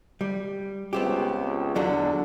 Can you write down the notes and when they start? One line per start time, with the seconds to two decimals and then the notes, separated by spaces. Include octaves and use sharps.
0.21 G3
0.93 C#2 B3 C4 G4
1.75 E2 D3 F#3 D4